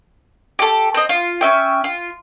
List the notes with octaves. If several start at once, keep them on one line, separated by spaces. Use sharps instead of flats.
G4 A4
C4 D#5
F4
C#4 E5 G5
F4